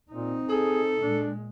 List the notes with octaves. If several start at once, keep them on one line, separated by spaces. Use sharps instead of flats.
A#2 C4 D#4
G#4 A4
A#2 G#3 D4